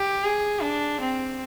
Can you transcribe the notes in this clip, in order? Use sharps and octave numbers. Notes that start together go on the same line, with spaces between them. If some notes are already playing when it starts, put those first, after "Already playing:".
Already playing: G4
G#4
D4
C4